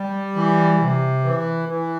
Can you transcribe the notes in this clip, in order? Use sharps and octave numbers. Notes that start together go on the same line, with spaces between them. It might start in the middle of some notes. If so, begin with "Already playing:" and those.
Already playing: G3
E3
C3
E3
E3